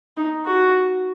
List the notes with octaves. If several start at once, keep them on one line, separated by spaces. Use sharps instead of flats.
D#4
F#4